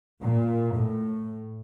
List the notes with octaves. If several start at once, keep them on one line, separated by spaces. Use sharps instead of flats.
A#2
A2